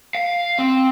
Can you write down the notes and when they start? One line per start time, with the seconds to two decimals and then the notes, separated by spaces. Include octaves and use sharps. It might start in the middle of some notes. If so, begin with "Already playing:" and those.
0.15 F5
0.59 C4